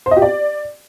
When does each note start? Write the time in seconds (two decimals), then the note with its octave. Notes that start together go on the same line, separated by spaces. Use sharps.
0.06 C5
0.11 D#5
0.17 G4
0.22 D5